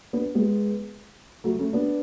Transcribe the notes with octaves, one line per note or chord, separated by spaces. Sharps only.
B3 D4
G#3 B3
F#3 A3
A3 C#4
B3 D4